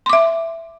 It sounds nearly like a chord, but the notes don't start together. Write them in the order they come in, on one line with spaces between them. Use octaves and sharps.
C6 D6 E5